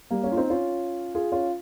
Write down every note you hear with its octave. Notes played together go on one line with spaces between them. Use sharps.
G3 A#3
A#3 C#4
F4
C4 D#4
C#4 F4
F4 G#4
C#4 F4